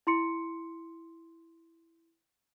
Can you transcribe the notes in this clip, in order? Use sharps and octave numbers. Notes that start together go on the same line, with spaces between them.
E4 C6 C#7